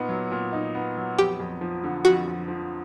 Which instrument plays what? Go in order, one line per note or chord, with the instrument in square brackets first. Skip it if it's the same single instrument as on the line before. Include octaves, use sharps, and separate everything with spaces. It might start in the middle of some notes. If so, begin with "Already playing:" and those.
Already playing: [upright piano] A#2 B3 D#4
F#3
A#2
D#4
B3
F#3
[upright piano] F2 [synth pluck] G4
[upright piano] F2
F3
D3
[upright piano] F2 [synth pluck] F#4
[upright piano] F2
F3